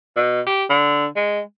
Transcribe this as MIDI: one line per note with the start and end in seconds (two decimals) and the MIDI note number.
0.16 0.41 47
0.46 0.64 67
0.69 1.06 50
1.16 1.41 56